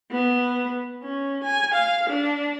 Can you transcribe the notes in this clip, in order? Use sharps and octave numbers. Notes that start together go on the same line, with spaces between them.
B3
C#4
G#5
F5
D4